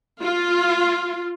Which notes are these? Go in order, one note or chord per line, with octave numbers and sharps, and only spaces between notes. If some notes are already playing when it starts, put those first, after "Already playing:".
F4